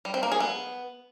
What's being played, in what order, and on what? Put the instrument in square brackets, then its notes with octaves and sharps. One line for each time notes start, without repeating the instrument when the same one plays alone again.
[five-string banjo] G3
C4
A#3
G#4
B3